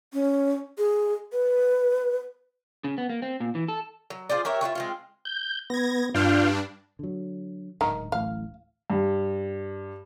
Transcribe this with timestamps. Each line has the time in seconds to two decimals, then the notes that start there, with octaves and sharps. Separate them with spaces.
0.13 C#4
0.78 G#4
1.32 B4
2.84 C#3
2.98 B3
3.10 A#3
3.22 C4
3.40 A#2
3.55 E3
3.68 A4
4.10 F#3
4.30 F4 G#4 C5 D5
4.45 G4 A#4 C#5 E5
4.61 E4 F4 B4 C#5
4.75 G#3 C4 F4
5.25 G6
5.70 B3 G#6 A#6
6.14 G2 D4 F4 F5 G5
6.99 D3 F#3
7.81 D1 G#2 D#3 A#5
8.12 D1 A1 A2 F5
8.90 G2